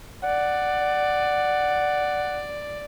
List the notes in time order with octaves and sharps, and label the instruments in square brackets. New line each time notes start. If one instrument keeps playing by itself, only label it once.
[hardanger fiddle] D5 [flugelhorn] F#5